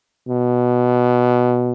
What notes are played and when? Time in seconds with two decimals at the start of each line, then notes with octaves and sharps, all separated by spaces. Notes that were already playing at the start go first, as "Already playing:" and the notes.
0.29 B2